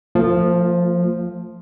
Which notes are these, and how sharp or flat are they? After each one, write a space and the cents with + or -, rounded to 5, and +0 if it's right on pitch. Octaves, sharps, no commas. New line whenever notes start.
F3 +5 A3 +45